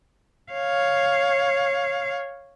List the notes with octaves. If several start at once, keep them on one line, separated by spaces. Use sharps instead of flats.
C#5 F5